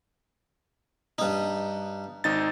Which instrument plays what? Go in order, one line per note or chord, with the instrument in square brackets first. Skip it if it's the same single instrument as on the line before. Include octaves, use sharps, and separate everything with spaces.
[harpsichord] G2 D#4
[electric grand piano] G#1 D#4 A6